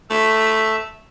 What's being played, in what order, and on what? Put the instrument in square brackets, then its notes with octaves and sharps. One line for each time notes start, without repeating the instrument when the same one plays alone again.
[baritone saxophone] A3 [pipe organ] E5